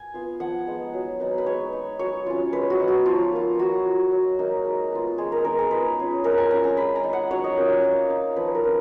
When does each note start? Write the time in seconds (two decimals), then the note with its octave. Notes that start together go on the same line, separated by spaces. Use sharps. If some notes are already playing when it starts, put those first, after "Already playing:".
Already playing: G#5
0.14 B3 F4
0.40 F3 F#5
0.67 G#3 B3 D#4
0.94 F#3
1.20 B3 D#4
1.38 B4
1.46 G#3 C#5
1.73 D#4
1.99 F#3 C#5
2.26 C#4 F4
2.53 G#3 B4
2.70 F#4
2.79 B3 D#4
2.88 F#4
3.05 F3 F4
3.32 A#3 F4
3.59 A#3 F#4
3.85 F4
4.11 F#3
4.39 A#3 D#4
4.65 G#3
4.92 B3 F4
5.18 G#3 G#4
5.32 A#4
5.45 B3 D#4 A#4
5.58 G#4
5.71 G#3 B4
5.97 C#4 F4
6.24 G#3 A#4
6.38 G#5
6.51 C#4 F4 A#5
6.64 A#5
6.77 G#3 B5
6.96 A#5
7.04 D#4
7.13 F#5
7.31 F#3 C#5
7.44 D#5
7.57 A#3 C#4 F4
7.84 A#3 F5
8.10 D#4
8.36 F3 B4
8.55 A#4
8.64 A#3 C#4 F4